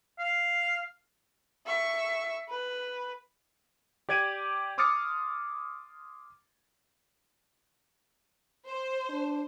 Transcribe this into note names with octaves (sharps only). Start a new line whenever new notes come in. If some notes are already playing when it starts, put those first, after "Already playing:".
F5
E5 C#6
B4
G4 D5 G#6 D7 D#7
C6 D6 D#6 F6 A6 C#7
C5
D4